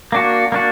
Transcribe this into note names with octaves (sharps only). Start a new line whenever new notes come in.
A#3 D4 F#4
A#3 D4 F#4